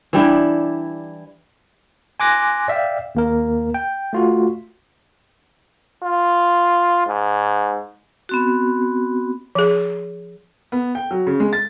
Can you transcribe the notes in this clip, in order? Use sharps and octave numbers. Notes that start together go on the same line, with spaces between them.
E3 G3 D4 E4
G#5 C6 D6 F#6 A#6
D5 E5 F5 G5
D#2 A#3 A#4
G5
A3 F4 F#4
F4
G#2
B3 C4 F#4
F3 G#4
B3
G5
F#3
C#3
G#3
A6